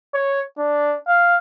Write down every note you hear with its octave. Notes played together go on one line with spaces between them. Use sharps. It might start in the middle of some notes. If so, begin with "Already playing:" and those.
C#5
D4
F5